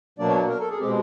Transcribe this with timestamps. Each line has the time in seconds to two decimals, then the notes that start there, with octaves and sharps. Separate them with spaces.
0.18 B2 F#3 A#3 D4 D5
0.28 C#5
0.49 A#4
0.60 A4
0.69 G#4
0.79 B2 G#3 C4 G4